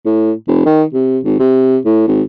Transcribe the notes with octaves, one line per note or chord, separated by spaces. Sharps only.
A2
F1
D#3
C3
G#1
C3
A2
G#1